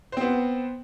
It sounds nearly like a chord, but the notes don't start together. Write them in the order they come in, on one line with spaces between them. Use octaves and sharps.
C5 C4 B3